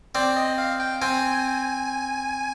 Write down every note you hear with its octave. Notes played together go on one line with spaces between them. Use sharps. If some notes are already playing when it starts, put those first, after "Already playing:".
C4 D5
D#5
F5
G5
C4 G#5